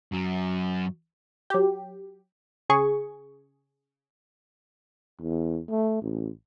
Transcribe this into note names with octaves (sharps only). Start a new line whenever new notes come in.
F#2 F#3
F#3 G4
C#3 G#4 C#6
E2
A3
A1